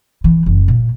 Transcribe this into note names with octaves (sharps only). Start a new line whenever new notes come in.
E3
F#1
A#2